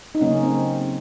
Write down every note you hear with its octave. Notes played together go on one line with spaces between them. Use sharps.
D#4
C#3 F#3 A#3 C#4
C4